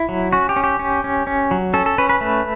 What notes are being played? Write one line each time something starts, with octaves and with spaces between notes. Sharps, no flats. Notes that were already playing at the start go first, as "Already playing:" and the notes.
Already playing: E4
F#3
C#4 F#4
G4
C#4
G4
C#4
C#4
C#4
F#3
C#4 A4
A4
C#4 B4
B4
A3